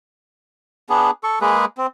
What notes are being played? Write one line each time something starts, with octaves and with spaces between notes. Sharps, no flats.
B3 D4 G#4
A4 C#6
G#3 A#3 G#4 B4
C4